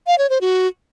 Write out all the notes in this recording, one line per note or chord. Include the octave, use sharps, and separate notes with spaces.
F5
C#5
C5
F#4